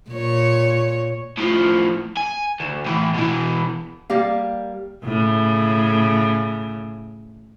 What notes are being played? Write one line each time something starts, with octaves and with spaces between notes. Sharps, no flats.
A#2 C#5
A2 F3
G#5
D2
A2 E3
B2 E3
G3 A#3 G4 F5
A2 C#3